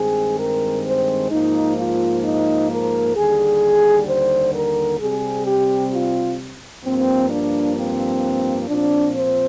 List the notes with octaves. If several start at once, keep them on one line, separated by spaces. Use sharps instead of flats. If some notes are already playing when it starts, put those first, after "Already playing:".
Already playing: G2 D#3 G#3 C4 G#4
A#4
C5
G#2 F3 A#3 D#4
F4
D#4
A#4
D#2 D3 G3 G#4
C5
A#4
C3 G3 C4 G#4
G4
F4
G2 F3 A#3 C4
D4
C4
A#2 F3 C4 D4
C5